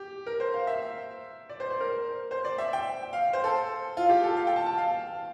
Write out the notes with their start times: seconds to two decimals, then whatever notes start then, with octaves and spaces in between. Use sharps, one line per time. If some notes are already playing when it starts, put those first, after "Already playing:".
Already playing: G4
0.27 A#4
0.40 C5
0.54 F5
0.67 E5
1.49 D5
1.60 C5
1.70 C5
1.80 A#4
2.31 C5
2.45 D5
2.58 E5
2.73 G5
3.13 F5
3.33 C5
3.44 A4
3.97 F4
4.09 G4
4.23 A4
4.37 F5
4.47 G5
4.56 A5
4.66 A5
4.78 F5